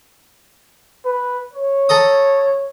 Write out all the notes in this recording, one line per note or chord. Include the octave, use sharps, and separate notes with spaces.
B4
C#5
A4 A#5 D#6